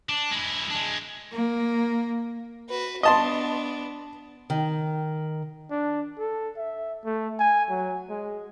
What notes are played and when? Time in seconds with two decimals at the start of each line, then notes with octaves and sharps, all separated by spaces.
0.09 D4
0.31 G#3 E4
0.70 G#3 D4
1.32 A#3
2.69 F#4 B4
3.03 B3 D4 D#5 A5 C6
4.50 D#3
5.71 D4
6.19 A4
6.57 E5
7.05 A3
7.39 G#5
7.70 F#3
8.10 G#3